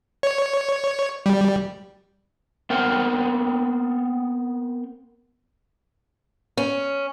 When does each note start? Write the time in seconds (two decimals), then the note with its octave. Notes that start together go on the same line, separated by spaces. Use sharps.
0.23 C#5
1.26 G3
2.70 B3 C4 A#4 C5 F#5 G5
6.57 C#4